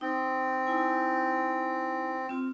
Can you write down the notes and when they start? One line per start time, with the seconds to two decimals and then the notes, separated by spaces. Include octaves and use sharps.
0.01 C4 D#4
0.67 D#4 E4 G#5
2.29 C4 F4